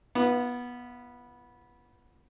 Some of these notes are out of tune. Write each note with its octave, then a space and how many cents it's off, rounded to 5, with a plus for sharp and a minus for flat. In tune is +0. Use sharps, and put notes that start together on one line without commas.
B3 -15 F4 -45